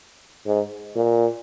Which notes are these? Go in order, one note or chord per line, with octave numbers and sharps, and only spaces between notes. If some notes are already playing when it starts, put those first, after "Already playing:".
G#2
A#2